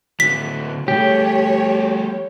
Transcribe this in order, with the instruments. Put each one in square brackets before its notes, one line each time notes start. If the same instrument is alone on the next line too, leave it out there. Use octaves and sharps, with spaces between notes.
[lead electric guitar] D3 F#3 [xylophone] B6
[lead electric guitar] G3 A3 [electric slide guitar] G4 [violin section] C#5